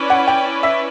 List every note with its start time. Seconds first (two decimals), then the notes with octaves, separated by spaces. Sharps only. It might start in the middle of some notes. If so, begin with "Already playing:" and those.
Already playing: C#4 E4 B4 D5
0.10 F#5
0.27 G5
0.63 E5